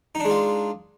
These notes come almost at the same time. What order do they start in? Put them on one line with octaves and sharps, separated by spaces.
D#4 D4 G#3 F4